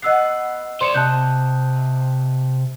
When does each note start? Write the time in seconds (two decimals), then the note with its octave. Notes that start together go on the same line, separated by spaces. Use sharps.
0.02 B3 B4 D#5 F#5 E6 C7
0.81 C5 D5 C6 C#7 E7
0.95 C3 D#5 A5 F#6 G6